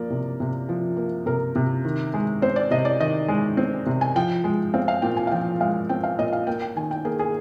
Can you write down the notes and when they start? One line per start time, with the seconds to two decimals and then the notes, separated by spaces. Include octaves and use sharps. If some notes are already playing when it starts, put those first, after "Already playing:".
Already playing: F3 A#3 D5
0.10 C3
0.40 C3
0.69 F3
0.97 A#3
1.26 C3 A#4
1.56 C3
1.84 D#3
2.14 G#3
2.42 C4 C5
2.56 D5
2.71 C3 D#5
2.85 D5
3.00 D#3 D#5
3.28 G#3
3.57 C4
3.86 C3
4.01 G#5
4.15 F3 G5
4.44 G#3
4.74 C4 F5
4.88 F5
5.02 A#2 G5
5.17 G#5
5.27 F5
5.31 F3 G5
5.60 G#3 F5
5.89 C4 G5
6.04 F5
6.18 A#2 D#5
6.33 F5
6.47 A#3 G5
6.62 G5
6.76 D#3 G#5
6.91 G5
7.05 A#3 G#4
7.19 G#4